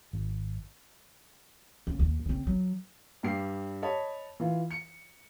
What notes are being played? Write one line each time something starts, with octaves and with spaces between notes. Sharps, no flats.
G#1
F1 C#3
D#2
C#3 C4
F#3
G2 G3 C7
C#5 D#5 A5 B5
E3 F4
C#7